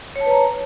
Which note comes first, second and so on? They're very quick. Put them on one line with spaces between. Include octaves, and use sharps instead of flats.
C#5 A5 B4 A#5